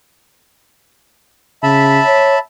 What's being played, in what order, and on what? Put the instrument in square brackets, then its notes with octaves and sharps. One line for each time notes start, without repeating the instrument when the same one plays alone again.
[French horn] C#3 [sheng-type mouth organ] E5 A5 B5
[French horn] C#5